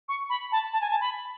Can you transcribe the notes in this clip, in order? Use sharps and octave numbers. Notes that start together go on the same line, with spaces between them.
C#6
B5
A5
A5
G#5
A5
B5